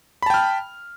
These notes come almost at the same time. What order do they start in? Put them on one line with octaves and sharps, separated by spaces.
B5 A5 G5 F6